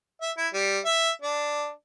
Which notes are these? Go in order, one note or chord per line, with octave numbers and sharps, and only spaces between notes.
E5
E4
G3
E5
D4